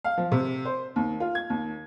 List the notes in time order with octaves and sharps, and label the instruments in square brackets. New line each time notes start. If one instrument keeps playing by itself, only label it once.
[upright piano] F5
F3
C3
C5
D#2
F4
G#6
D#2